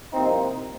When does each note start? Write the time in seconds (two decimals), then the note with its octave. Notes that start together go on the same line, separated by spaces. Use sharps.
0.13 C2 C3 F3 A#3 C4 D#4